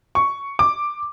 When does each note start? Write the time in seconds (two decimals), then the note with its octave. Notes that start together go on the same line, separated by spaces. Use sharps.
0.15 C#6
0.59 D6